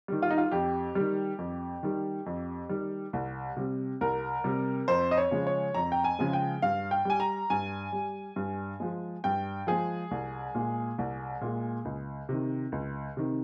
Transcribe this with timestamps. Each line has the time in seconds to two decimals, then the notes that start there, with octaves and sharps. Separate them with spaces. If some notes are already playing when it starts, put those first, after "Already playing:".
0.08 D#3 G3
0.22 F4
0.31 D#4
0.38 F4
0.52 F2 G4
0.95 D#3 G3
1.38 F2
1.83 D#3 G3
2.26 F2
2.69 D#3 G3
3.13 C2
3.56 C3 G3
4.01 C2 A#4
4.44 C3 G3
4.88 F2 C5
5.11 D#5
5.18 C#5
5.31 C#3 F3 G#3
5.47 C#5
5.74 F2 A#5
5.92 G5
6.04 G#5
6.19 C#3 F3 G#3
6.33 G5
6.62 G2 F5
6.91 G5
7.05 G3 G#5
7.20 A#5
7.50 G2 G#5
7.92 G3
8.36 G2
8.80 F3 G#3
9.24 G2 G5
9.67 F3 G#3 G#4
10.11 C2
10.55 A#2 G#3
10.98 C2
11.41 A#2 G#3
11.85 C#2
12.29 C3 D#3
12.72 C#2
13.17 C3 D#3